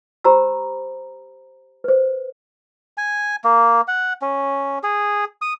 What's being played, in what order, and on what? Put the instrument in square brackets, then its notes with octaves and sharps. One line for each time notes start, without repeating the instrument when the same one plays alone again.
[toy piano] G4 C5 A#5 B5 E6
B4 C5
[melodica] G#5
A#3
F#5
C#4
G#4
D#6